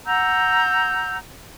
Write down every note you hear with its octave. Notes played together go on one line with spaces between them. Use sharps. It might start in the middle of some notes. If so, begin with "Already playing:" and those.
F#5 A#5 E6 G6